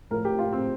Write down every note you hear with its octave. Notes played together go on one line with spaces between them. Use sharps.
A2 F3 A#4
G4
F4
C4